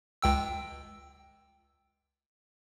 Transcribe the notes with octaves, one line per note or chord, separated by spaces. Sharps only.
C#2 G5 E6